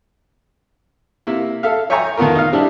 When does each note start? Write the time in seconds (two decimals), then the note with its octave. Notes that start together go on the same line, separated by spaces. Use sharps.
1.27 C3 A#3 E4
1.63 A4 E5 F5
1.90 C#5 E5 G5 G#5 A#5 C#6
2.17 D#3 A3 B3 F4 A#4
2.35 D#4 F5
2.53 G3 C4 D4 E4 G4